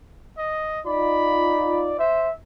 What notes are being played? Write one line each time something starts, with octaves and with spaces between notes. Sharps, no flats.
D#5
D#4 F4 D5 B5
C5 E5